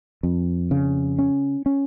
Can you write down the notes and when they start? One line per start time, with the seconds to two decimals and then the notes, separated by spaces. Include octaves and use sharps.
0.23 F2
0.71 C#3
1.19 C#4
1.66 C#4